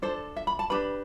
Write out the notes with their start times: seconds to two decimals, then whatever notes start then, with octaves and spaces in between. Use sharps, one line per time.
0.02 D4 A4 C5
0.36 E5
0.47 B5
0.59 A5
0.70 D4 G4 B4 B5